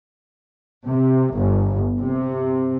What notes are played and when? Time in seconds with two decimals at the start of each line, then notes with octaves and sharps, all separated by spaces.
0.87 C3
1.34 G1
2.00 C3